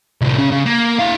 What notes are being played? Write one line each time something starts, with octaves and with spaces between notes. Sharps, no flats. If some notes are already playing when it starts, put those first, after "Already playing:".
C2 A2
C#3
C#3
A#3
E4 F5